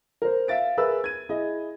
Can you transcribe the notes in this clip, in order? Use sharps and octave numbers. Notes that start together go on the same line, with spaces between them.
A#4 C5
E5 F5 A6 D7
G#4 A#4 B4 E5 E6
G#6 D#7
E4 G#4 D#5